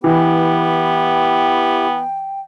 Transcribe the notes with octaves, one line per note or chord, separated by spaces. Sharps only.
E3 B3 E4 G4 G5